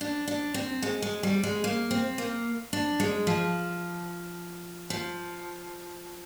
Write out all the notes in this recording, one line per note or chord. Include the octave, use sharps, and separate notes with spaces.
D4
D4
C4
G#3
G#3
G3
G#3
A#3
C4
A#3
D4
G#3
F3
F3